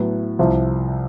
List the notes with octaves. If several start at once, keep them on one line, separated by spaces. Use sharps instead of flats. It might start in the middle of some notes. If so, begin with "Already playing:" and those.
Already playing: A2 F#3 B3 E4
C2 C3 F3